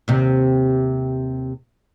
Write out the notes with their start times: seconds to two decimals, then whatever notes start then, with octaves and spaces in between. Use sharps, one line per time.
0.08 D#2 C3